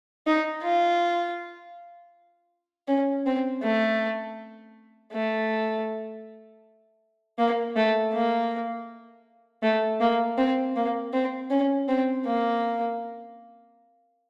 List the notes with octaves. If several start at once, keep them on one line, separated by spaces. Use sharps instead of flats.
D#4
F4
C#4
C4
A3
A3
A#3
A3
A#3
A3
A#3
C4
A#3
C4
C#4
C4
A#3